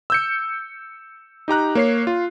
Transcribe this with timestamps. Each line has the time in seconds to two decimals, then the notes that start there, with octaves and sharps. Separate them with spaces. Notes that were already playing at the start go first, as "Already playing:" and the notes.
0.10 E6 G6 C#7
1.48 D#4 G4 A#5 F#6
1.75 A#3 C#5 C7
2.07 F4